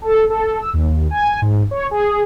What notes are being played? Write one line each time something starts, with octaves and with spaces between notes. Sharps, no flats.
A4
A4
E6
D#2
G#5
G#2
C#5
G#4